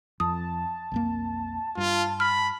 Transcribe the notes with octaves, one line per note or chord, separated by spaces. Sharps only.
F2 A5 D#6
B1 F2 A#3
G2 F4
B5 F6